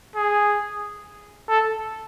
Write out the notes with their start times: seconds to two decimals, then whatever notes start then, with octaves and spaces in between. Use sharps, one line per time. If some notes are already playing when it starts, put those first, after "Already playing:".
0.16 G#4
1.49 A4